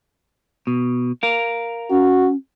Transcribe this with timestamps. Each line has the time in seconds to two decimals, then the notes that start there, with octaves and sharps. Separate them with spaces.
0.67 B2
1.23 A#4 F5
1.90 C#4 F#4